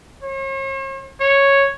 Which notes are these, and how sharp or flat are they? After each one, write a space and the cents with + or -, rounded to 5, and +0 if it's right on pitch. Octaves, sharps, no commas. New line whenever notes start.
C#5 -45
C#5 -5